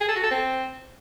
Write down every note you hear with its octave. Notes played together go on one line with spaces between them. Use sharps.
G#4
A4
F#4
A4
C4